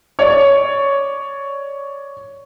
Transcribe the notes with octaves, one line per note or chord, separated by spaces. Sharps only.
C#5 D5